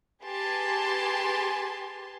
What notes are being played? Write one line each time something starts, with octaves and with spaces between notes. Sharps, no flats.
G4 G#4 B4 G#5 A5 C6